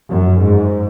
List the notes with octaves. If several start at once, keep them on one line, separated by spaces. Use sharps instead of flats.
F#2
G#2